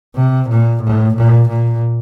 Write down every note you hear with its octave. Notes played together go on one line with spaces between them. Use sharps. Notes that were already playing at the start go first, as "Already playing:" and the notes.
C3
A#2
A2
A#2
A#2